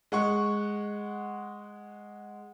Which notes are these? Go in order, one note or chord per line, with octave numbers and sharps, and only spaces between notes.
G#3 F#5 C#6